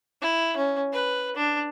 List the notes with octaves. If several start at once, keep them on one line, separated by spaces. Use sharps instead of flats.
E4
C#4
B4
D4